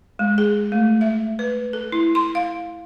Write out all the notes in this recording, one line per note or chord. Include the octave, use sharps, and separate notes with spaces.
G#3
G#4
A3
E5
B4
A4
E4
C6
F5